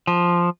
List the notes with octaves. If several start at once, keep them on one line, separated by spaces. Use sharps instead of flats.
F3